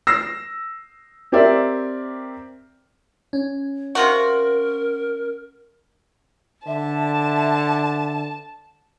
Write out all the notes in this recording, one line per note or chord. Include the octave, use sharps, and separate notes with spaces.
E6 A#6 C7
C4 G4 A#4 D5 E5
C#4
C3 F4 F#4 A#4
D3 E5 A5